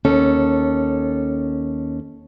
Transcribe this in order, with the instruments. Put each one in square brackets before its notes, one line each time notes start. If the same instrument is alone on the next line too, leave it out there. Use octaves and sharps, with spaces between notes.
[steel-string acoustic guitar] D#2 C#4 A4